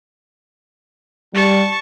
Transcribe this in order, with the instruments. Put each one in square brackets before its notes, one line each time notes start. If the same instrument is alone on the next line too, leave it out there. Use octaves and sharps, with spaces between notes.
[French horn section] G3 [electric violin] A5 C#6